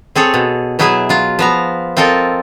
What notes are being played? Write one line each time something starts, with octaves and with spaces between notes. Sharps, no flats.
C4 G#4 A4 C#5
B2
B2 F#3 E4 G#4 E5 G#5
F#3 F4
F3 B3 A#5
C4 F4 A4 A#4 D#5